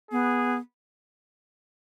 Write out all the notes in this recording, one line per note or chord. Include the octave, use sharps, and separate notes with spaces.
B3 G#4